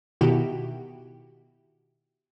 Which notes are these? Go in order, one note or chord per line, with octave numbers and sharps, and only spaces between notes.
B2 D#3 E4 F#4 G4